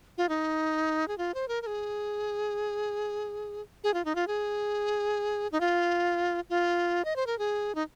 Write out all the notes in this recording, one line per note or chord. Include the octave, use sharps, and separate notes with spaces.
F4
D#4
G#4
F4
C5
A#4
A#4
G#4
G#4
F4
D#4
F4
G#4
D#4
F4
F4
D#5
C5
A#4
G#4
D#4